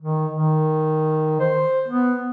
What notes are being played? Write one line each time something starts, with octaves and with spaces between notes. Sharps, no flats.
D#3
D#3
C5
B3